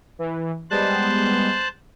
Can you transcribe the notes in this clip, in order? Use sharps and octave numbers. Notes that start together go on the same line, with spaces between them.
E3
G3 G#3 B3 C5 A5 F#6